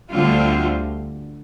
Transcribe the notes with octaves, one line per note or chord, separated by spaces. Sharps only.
D2 D3 G3 C4 F4